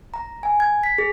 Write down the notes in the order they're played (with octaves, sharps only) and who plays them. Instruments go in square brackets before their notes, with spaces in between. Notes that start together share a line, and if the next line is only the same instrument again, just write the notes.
[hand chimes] A#5
G#5
G#6
B6
G#4